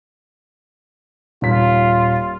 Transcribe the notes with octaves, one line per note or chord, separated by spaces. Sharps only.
D#1 F4 B6